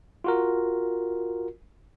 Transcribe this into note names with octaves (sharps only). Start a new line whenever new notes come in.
F4 F#4 A#4